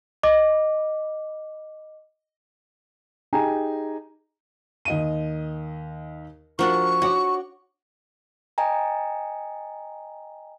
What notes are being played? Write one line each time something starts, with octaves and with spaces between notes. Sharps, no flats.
D#5 D6
D#4 G4 G#4 G5 G#5 A#5
D#2 D#5 D#7
F3 D4 F#4 A#4 F#5 C#6
F#4 C#5 F#5 D6
D#5 G5 G#5 A#5